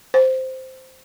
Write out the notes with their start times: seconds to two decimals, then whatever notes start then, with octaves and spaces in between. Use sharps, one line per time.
0.14 C5